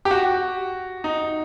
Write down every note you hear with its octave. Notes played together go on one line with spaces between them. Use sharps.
G4
F#4
D#4